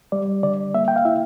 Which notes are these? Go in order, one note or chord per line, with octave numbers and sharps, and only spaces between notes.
G3 D5
D3 D5
A#3 E5
G5
F5
E4 E5